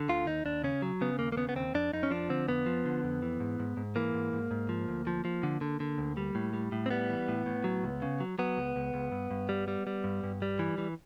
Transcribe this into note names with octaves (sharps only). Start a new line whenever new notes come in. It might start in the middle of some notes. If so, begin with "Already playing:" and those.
Already playing: D3
D2 F4
D#2 D#4
D#2 D4
C#3 C#4
F#3
C#3 B3
D#2 A#3
A#3
C#3 B3
B3
D#2 C4
F2 D4
F2 D#4
C#4
F3 D4
D3 C4
F2 B3
F3
D3
F2
E3
G#2
G#2
G#2
E3 A#3
G#2
G#2
G#2
F3
D2
F3
F3
D3
D3
D3
D2
G3
A2
G3
A2
C4
G3 B3
E3
A2
A2
F#3
C#2
C#3
F#3
F#3 B3
C#2
C#2
C#2
G2
G2
G3
G3
G3
G2
G2
G3
E3
E3